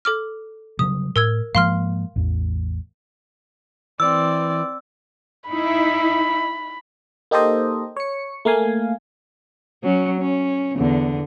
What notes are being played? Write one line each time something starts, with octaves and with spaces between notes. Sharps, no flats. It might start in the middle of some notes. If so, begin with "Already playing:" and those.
A4 D6 F6
C#3 F#3 G3 D#6
A2 A#4 E6 G#6
G#2 F3 A#3 F5 C6 F6
A1 E2
E3 C4 D5 E6
D#4 E4 B5
A#3 D#4 G4 A4 C5 D#5
C#5 C#7
A3 A#3 F5 G#5
F#3 C#4
C#4
E2 D3